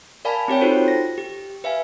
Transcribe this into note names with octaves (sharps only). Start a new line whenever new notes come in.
A#4 D5 F5 G#5 A5 B5
C4 G4 C#5 G5
D#4 F4 F#4 A4 C5
A#6
G4
B4 E5 F5 G#5